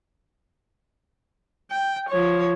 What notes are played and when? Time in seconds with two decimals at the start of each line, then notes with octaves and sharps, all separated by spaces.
1.71 G5
2.09 F3 C#5